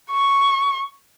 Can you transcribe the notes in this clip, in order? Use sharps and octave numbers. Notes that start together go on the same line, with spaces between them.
C#6